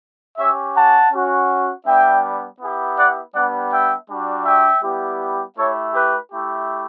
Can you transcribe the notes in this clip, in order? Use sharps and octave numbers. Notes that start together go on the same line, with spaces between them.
C#4 G4 C#5 E5
F#5 A5
C#4 F#4
G3 B3 D4 E5 G5
B3 E4 G4
D5 F#5
G3 B3 D4 G4 D5 F#5
E5 G5
G3 D4 F#4
E5 G5
G3 B3 E4 G4
A3 E4 G4 A4 C#5
G4 B4
A3 E4 G4